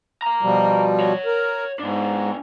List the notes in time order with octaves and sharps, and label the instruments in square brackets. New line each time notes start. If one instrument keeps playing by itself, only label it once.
[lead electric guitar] F5 A#5
[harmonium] B2 F3 G3
[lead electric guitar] C#5 F#5
[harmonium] A#4
[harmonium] G#2 [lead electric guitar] B3 D4